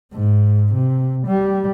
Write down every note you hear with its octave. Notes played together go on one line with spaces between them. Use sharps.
G#2
C3
G3